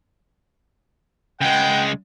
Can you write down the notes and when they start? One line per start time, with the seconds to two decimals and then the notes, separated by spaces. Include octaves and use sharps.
1.41 C#3 G#3 B4 F#5 G5